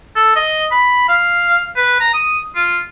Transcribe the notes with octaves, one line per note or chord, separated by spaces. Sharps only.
A4
D#5
B5
F5
B4
A#5
D#6
F4